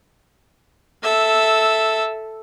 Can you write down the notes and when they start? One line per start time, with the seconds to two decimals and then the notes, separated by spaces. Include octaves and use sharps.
1.03 A4 E5